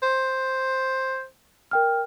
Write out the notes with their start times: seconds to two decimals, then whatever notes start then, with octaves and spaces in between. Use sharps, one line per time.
0.03 C5
1.71 A#4 G5 F6